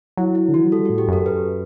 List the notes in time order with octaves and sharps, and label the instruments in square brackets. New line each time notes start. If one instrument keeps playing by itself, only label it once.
[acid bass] F#3 [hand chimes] E4
[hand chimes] E4
[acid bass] D3
[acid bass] E3 [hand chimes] F#4
[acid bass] F#3
[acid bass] G3 [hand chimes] A4
[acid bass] A2 [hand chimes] F#4
[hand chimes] G4
[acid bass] F#2 [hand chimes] A4
[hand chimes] B4